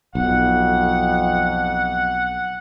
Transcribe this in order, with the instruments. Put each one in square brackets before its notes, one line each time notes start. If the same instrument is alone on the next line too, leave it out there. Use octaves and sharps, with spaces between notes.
[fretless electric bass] B1 [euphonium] F2 [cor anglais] F#5